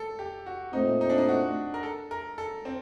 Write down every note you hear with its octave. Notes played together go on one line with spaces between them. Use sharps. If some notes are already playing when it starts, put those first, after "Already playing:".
Already playing: A4
G4
F#4
A#2 A3 C4 D#4
D#4
D4
D#4
F#4
A#4
A4
A#4
A4
C4